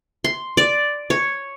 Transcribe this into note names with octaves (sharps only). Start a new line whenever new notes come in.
C6
D5
C#5